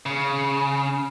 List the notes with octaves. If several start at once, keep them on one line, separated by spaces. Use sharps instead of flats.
C#3